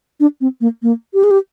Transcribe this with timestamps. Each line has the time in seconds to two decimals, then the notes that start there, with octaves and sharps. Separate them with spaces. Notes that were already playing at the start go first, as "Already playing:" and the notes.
0.20 D4
0.41 C4
0.61 A#3
0.83 A#3
1.14 G4
1.24 G#4
1.31 G4